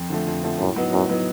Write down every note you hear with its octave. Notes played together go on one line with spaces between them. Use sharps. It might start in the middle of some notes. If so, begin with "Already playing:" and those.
Already playing: F2
D3 F3 A3
F2
D3 F3 A3
F#2 A2
F#3 B3 D#4
F#2 A2
F#3 B3 D#4